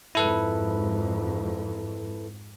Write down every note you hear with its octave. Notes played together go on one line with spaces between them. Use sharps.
F2 G#2 E4 A4 B4